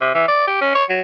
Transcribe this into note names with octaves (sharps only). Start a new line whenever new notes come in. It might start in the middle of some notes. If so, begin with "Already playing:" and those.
C3
E3
D5
G4
C#4
C#5
F#3